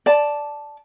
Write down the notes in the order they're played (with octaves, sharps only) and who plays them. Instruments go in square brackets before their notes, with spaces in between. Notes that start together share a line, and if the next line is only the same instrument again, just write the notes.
[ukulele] D5 A5